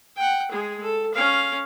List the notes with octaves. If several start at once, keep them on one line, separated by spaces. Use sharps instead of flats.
F#5 G5
G#3 G#4
A4
C#4 F5